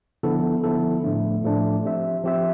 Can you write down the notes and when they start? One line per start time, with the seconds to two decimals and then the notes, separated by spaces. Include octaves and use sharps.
0.23 D3 F3 B3 E4 A4
0.64 D3 F3 B3 E4 A4
1.04 A2 F3 A3 D4
1.44 A2 F3 A3 D4
1.84 F3 C4 G4 C5 E5
2.23 F3 C4 G4 C5 E5